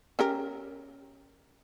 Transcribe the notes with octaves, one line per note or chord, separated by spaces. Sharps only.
C#4 G4 A#4